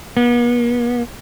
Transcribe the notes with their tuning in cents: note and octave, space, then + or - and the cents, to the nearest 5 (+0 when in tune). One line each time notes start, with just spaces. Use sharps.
B3 -45